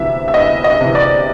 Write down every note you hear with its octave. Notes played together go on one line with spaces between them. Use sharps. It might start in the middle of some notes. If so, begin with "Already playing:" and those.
Already playing: D2 C3 E3 E5
E5
D2 D#5
D#5
C3 E3
D5